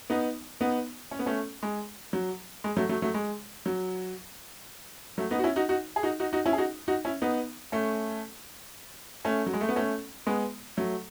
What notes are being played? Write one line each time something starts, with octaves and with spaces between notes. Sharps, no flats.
B3 D#4
B3 D#4
C#4
B3
A3 C#4
G#3
F#3
G#3
F#3 A3
F#3 A3
F#3 A3
G#3
F#3
F#3 A3
B3 D#4
F#4
C#4 E4
D#4 F#4
D#4 F#4
G#4
D#4 F#4
D#4 F#4
D#4 F#4
C#4 E4
G#4
D#4 F#4
D#4 F#4
C#4 E4
B3 D#4
A3 C#4
A3 C#4
F#3
G#3
A3
B3
A3 C#4
G#3 B3
F#3 A3